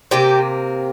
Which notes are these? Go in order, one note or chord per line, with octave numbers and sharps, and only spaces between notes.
C3 A#3 G4